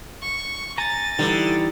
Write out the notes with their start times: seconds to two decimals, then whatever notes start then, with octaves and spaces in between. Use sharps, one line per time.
0.22 C#6
0.78 G#5 A#5 A6
1.19 D3 E3 G3 D#4 E4